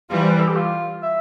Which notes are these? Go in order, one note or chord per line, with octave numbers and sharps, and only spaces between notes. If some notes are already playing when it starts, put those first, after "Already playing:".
E3 G3 F4
C5
B4
A4
G4
F4
E5